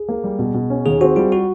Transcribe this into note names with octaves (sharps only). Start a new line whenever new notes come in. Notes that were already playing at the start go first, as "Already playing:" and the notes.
Already playing: G#4
A#3
G3
B2
B2
C#4
D#2 G#4
C4 F#4
G3 F4
F#4